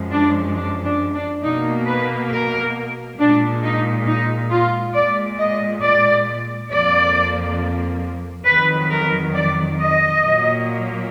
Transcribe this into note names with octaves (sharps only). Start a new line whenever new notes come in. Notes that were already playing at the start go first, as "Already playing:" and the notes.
Already playing: F#2 F3 G#3
D4
D4
D4
D4
B2 A#3 D#4
B4
A#4
A#2 G#3 D4
D#4
D#4
F4
A#2 G#3 D5
D#5
D5
F2 F3 A#3 D5
F2 D#3 F#3 B4
A#4
D5
D#5
A#2 F#3 A#3